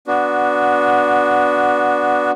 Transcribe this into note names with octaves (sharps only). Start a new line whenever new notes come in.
B3 D4 F#4